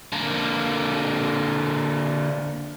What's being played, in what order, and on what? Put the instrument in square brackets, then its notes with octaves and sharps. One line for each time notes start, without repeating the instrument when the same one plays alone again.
[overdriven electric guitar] D3 A#3